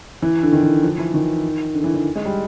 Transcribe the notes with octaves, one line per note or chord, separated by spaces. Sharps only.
E3
D3
D#3
E3
F3
E3
D#3
D3
E3
E3
G#3
G3